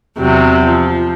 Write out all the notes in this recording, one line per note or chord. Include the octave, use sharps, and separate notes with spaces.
E2 C3 F#3
F3